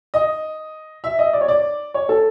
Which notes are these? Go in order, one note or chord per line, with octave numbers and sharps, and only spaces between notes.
D#5
E5
D#5
D5
C#5
D5
C#5
A4